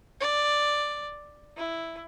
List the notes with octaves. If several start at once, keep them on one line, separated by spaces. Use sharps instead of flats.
D5
E4